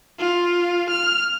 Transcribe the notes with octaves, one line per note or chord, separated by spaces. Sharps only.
F4
F6